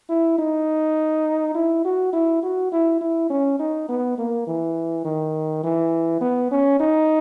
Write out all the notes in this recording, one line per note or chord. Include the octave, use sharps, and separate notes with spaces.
E4
D#4
E4
F#4
E4
F#4
E4
E4
C#4
D#4
B3
A#3
E3
D#3
E3
B3
C#4
D#4